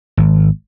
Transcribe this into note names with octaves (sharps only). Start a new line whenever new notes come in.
G#1